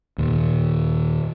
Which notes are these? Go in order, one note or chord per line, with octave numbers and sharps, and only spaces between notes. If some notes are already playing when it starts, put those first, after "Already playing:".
D#2 A#2